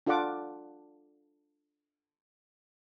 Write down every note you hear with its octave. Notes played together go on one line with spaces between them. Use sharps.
D4 F4 A4 D5 F#5 D6